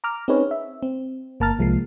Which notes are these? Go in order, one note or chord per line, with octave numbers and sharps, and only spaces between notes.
A#5 D6 F6
C4 C#4 D#4 G#4 B4 C#5
E5
C4
G1 A#3 A5 A#5 F6 A6
C2 F3 G#3 A#3 C7